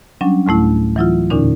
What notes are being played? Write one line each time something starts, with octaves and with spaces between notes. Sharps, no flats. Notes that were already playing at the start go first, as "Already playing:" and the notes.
F#3 G3 C#4 D4
D2 A2 A3 E4
E3 F#3 E4 F4
E2 A#2 D3 C#4 D#4